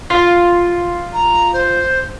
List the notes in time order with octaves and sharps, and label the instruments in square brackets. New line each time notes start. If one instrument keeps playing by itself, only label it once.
[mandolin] F4
[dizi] A#5
C5